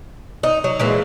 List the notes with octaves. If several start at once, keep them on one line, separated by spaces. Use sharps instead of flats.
D#4
F#3
A#2 E3 G#3